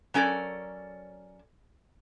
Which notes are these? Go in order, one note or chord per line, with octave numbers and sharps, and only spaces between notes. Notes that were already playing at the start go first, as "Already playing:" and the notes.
F#3 C#4 A4 A#4 D5